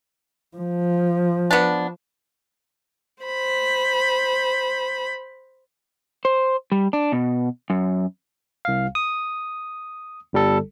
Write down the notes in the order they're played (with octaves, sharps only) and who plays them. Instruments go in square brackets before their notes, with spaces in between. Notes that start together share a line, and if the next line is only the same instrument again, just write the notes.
[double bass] F3
[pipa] B3 D4
[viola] C5 B5
[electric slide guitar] C5
G3
D4
B2
F#2
[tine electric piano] C2 F5
D#6
G1 G3 A4